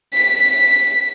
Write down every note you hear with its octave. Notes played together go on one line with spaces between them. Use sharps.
B6